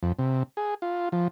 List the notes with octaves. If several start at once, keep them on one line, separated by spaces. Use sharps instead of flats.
F2
C3
G#4
F4
F3